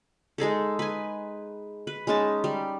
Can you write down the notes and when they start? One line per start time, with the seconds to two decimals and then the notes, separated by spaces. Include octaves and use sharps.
0.38 G#3 D#4 G#4 A4
0.79 B4 G#5
1.87 B4
2.07 G#3 C#4 D#4 A5
2.44 G3